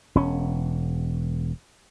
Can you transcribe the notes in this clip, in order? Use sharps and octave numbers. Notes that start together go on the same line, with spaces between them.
E1 C#4